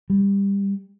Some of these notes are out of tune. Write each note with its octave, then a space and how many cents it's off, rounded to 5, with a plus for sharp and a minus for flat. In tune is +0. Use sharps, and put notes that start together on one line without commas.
G3 +20